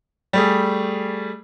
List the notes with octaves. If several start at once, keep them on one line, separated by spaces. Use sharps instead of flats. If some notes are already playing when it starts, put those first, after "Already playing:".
G3 A3 G#4